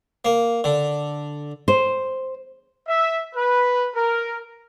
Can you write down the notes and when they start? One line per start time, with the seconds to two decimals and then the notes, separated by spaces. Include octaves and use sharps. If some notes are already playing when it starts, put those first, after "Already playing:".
0.25 A#3
0.64 D3
1.68 C5
2.88 E5
3.36 B4
3.94 A#4